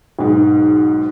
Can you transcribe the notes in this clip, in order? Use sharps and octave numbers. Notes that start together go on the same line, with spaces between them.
B1 G#2